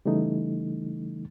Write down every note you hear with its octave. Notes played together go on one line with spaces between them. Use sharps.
C#3 E3 G3 A3 D#4